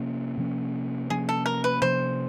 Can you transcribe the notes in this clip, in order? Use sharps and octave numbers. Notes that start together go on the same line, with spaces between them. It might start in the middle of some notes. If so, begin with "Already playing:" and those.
Already playing: C3 F3 A#3 C#4
C3 F3 A#3 C#4
C3 F3 A#3 C#4 G#4
A4
A#4
B4
C3 F3 A#3 C#4 C5